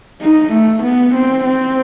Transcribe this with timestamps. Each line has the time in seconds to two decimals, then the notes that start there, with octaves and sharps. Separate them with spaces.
0.22 D#4
0.53 A3
0.83 B3
1.15 C4
1.45 C4